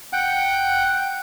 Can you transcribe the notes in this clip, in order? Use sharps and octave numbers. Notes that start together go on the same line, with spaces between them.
F#5 G5